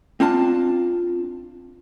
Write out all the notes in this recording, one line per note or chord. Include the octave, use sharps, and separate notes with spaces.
C4 D4 F4 A5